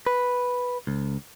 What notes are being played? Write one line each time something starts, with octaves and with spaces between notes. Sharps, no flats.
B4
C#2